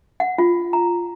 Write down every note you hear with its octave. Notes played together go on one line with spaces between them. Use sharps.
F#5
F4
A#5